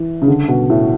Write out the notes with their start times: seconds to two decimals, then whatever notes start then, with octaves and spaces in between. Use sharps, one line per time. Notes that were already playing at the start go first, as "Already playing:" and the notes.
Already playing: E3
0.22 C#3
0.28 D3
0.48 B2
0.70 A2